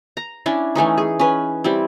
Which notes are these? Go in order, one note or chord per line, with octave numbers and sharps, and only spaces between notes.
A#5
C#4 D4 E4
E3 A3 C#4 D#4
G#4
C#4 B4
G3 C4 E4